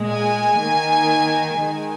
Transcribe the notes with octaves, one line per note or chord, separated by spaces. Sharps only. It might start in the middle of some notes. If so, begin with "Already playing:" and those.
Already playing: A#2 G#3
G#5
D#3 A#3
D#3 G#3